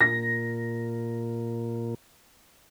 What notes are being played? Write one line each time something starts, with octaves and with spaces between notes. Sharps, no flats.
A#2 A#6